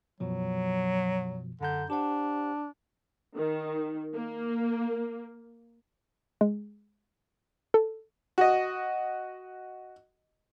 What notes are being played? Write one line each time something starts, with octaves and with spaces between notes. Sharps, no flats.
F#2 B2 F3 F#3
F#2 D3 A#5 G6
D4 G4 C5 F#5
D#3
A#3
G#3
A4
F#4 D#5